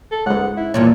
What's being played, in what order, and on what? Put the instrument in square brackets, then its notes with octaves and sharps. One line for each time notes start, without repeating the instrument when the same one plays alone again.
[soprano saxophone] A4
[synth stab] C#2 G#2 [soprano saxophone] F#5
[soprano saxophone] E4
[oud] E2 G2 A#2 [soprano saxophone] C#5